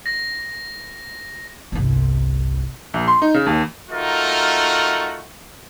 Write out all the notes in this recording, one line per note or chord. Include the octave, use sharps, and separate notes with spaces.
A#6
G1 C2
A#1
C6
D#4
C#3
D#2
A3 D#4 F4 F#4 A#4